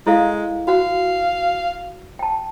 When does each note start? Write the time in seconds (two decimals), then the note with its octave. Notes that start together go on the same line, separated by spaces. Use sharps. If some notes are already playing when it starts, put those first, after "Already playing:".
0.07 G#3 E4 A4 F5
0.68 F#4 F5 F#5
2.19 G5 A5